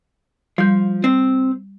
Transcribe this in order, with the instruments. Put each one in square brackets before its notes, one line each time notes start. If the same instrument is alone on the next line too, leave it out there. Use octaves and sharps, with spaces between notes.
[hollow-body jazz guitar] F3 [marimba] G3 G6
[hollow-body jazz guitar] C4